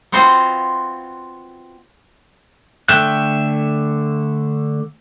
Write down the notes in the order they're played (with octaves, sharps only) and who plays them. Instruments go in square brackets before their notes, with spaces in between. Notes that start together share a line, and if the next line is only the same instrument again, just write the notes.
[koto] B3 C4 F4 F#4 C5 D#5
[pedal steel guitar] D3 A3 E5 G5 F#6